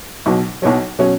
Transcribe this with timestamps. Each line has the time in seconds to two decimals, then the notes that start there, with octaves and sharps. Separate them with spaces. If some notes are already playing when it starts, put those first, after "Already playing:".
0.26 B1 B2 F#3
0.62 B1 B2 F#3 C#5
0.99 B2 F#3 C#4